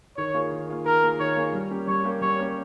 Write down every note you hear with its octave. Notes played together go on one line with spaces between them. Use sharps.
D#3 C#5
A#3 F4 G#4
D#3
A#3 F4 G#4
D#3 A#4
A#3 F4 G#4
D#3 C#5
A#3 F4 G#4
G3
A#3 C#4 G4
G3 C#5
A#3 C#4 G4
G3 C#5
A#3 C#4 G4